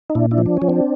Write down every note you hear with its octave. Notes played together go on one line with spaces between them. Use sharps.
D#4
A#2 D4 E4
D4 E4
F3
D4
F3 C#4
C4 D4